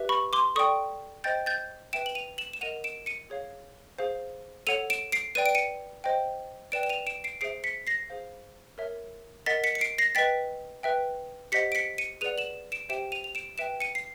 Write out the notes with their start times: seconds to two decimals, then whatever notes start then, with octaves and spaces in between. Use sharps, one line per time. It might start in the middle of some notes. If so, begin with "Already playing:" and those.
Already playing: G4 B4 E5
0.09 B5 C#6
0.33 C6 D6
0.56 A4 D5 G5 C#6 D#6
1.24 C5 D#5 G5 G6 A6
1.46 G6 A6
1.93 B4 E5 G5 D7 E7
2.06 F#7
2.15 D#7 F7
2.38 E7 F#7
2.53 E7
2.61 A#4 D#5 F#5 D#7 F7
2.84 D7 E7
3.06 C#7 D#7
3.30 G#4 C#5 F5
3.99 G#4 C5 F5
4.67 A4 C#5 F#5 D#7 F7
4.90 D7 E7
5.12 C7 D7
5.35 B4 D5 G5 D#7
5.46 D7
5.55 C#7 D#7
6.04 C5 D#5 G5
6.72 B4 D5 G5 D7 E7
6.83 E7
6.89 D#7 F7
7.06 D7 E7
7.24 C7 D7
7.41 G#4 C5 E5 C7 D7
7.64 B6 C#7
7.87 A#6 C7
8.10 G#4 C5 F5
8.78 A#4 C#5 E5
9.46 A#4 D#5 F#5 A6 B6
9.64 B6 C#7
9.75 C#7
9.81 C7 D7
9.98 A#6 C7
10.15 B4 D#5 G5 A6 B6
10.83 B4 E5 G5
11.52 G4 C5 D#5 F#5 B6 C#7
11.72 D7
11.75 B6 C#7
11.98 C#7 D#7
12.21 G#4 B4 D5 F#5 D#7 F7
12.38 E7 F#7
12.72 D7 E7
12.89 G4 C5 E5 G5 D7 E7
13.12 D#7 F7
13.24 F7
13.35 D7 E7
13.58 B4 E5 G5 D7 E7
13.80 C#7 D#7
13.95 C7